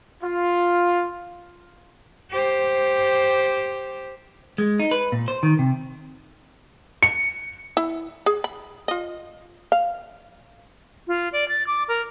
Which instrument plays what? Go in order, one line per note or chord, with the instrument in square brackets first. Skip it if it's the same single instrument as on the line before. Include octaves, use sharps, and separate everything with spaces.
[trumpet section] F4
[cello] G4 C5
[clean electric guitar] G#3
D#4
B4
A#2
C5
D#3
C3
[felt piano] C#7
[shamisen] E4
G#4
B5
F4 D#5
F5
[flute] F4
D5
A6
D6
A#4